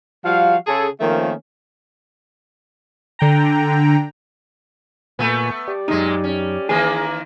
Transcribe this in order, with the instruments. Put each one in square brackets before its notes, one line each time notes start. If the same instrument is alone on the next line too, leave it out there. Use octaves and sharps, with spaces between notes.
[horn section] F3 G3 F#4 F5
C#3 G#4 A4
D#3 F3 A3 A#3 C4 C#4
[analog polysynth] D3 G5 A#5
[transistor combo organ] A#2 B4 G#5 [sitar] A3 B3
[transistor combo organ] G4 D5
[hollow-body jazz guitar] F#2 D#4 [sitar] A#2 G#3
[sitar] C#4
[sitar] D#3 E3 A#3 [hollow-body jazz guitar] G#4